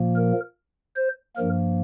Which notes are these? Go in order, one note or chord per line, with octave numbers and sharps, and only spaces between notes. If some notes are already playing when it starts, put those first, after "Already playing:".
Already playing: A#2 F3 A#3
A#4
C5
G2 F3 A#3 A#4